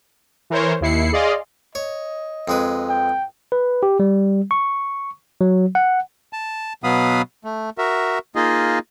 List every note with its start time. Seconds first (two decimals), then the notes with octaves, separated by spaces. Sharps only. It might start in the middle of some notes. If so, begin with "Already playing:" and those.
0.50 E3 A#4 C5 C#5
0.81 D#2 E4 C7 C#7
1.12 G#4 D5 D#5 F5 C6
1.75 C#5 D#5
2.48 F2 G#3 B4
2.90 G5
3.52 B4
3.83 G4
4.00 G3
4.51 C#6
5.41 F#3
5.75 F#5
6.33 A5
6.84 B2 F#3 B3 F5 B5 D#6
7.44 A3
7.78 F#4 A#4 E5
8.36 A#3 D#4 F4 G#4 D#5